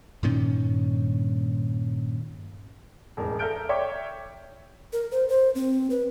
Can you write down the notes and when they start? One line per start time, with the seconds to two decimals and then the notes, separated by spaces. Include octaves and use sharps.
0.23 G2 A#2 D#3 C#4
3.17 E1 A1 A#4
3.39 A4 E5 A#5 F6 G6 D7
3.69 C#5 E5 G5 C#6 D6
4.93 A#4
5.11 C5
5.29 C5
5.55 C4
5.90 B4